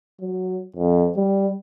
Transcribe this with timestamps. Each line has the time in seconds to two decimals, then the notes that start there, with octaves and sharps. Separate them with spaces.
0.21 F#3
0.77 F2
1.17 G3